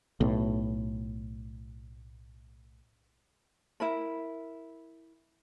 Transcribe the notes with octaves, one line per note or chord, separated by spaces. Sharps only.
B1 A2
E4 A#4 B5